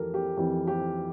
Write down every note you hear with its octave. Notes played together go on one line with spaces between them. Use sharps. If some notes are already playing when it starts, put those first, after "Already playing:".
Already playing: F2 E3 G4 A4 A#4
G4
F2 E3 G4
G4